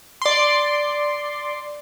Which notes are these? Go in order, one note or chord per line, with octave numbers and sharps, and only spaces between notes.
D5 C6